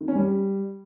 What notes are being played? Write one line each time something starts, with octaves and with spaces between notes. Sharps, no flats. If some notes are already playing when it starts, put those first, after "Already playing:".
D#3
C#4
G3